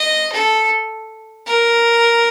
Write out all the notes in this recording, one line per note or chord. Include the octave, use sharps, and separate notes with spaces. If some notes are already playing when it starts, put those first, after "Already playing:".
Already playing: D#5
A4
A#4